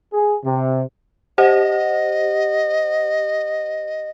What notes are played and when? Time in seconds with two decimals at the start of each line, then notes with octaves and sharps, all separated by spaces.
0.13 G#4
0.44 C3
1.38 G4 C5 D#5 F#5